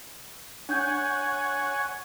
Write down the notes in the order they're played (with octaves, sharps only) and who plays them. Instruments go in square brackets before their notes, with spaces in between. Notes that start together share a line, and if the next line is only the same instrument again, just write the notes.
[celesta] D4 G6 [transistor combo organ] C#5 F#5 G#5